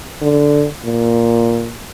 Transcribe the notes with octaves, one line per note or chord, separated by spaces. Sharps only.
D3
A#2